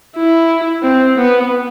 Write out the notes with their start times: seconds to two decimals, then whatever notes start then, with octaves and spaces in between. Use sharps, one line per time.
0.17 E4
0.83 C4
1.18 B3